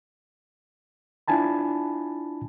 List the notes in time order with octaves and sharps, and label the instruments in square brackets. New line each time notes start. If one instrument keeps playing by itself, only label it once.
[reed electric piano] D4 E4 F4 G#5 A5 B5